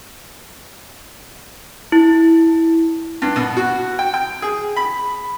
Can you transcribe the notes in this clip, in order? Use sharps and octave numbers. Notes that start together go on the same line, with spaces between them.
E4
G2
B2
F#4
G5
G5
G#4
B5